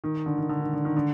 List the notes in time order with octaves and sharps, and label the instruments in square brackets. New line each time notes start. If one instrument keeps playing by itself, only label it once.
[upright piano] D#3
D3
D#3
D3
D#3
D3
D#3
D3